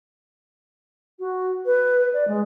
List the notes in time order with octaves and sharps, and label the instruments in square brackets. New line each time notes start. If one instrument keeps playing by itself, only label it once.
[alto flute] F#4
B4
D5
G#3